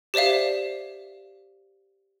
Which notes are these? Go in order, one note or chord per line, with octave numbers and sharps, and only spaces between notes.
G4 C5 D5 E5 F5